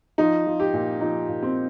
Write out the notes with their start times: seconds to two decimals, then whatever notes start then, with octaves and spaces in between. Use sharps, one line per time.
0.18 F3 D#4
0.47 F3
0.60 G4
0.73 A#2
1.01 F3 D#4
1.29 A#2
1.42 C4